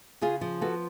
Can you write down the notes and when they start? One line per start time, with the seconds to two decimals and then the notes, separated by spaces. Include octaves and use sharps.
0.21 C#3 F4 G#4
0.41 F3
0.61 B3 F#4 A4